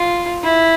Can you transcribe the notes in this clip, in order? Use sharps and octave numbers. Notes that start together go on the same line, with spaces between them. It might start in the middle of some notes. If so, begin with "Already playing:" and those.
Already playing: F4
E4